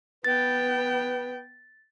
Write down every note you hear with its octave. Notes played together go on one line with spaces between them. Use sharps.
B3 B4 G5 A6